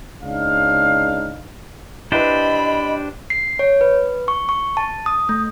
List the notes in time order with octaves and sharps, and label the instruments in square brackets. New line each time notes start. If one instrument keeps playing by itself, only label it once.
[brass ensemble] C#2 D4 D#4 F5
[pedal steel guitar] D4 G4 C5 [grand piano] E4 B4 [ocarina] D#5 [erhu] B5
[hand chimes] C7
C#5
B4
C#6
C#6
A5
D#6
A3